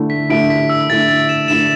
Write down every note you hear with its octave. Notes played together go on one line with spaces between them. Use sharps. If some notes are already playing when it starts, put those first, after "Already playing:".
Already playing: D3 A3 E4
B6
D3 A3 E4 D7
B6
E6
D3 A3 E4 A6
A6
E7
D3 A3 E4 E7